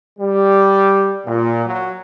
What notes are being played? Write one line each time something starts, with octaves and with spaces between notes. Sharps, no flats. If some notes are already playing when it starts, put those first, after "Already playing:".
G3
A#2
F#3